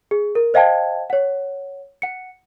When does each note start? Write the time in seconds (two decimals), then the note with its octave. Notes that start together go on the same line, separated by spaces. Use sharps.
0.11 G#4
0.35 A#4
0.54 C5 D#5 F5 G5 A5 G#6
1.10 C#5 F#5
2.02 F#5 C#7